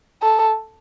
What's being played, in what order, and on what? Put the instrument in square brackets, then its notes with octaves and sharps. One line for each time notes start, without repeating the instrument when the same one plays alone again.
[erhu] A4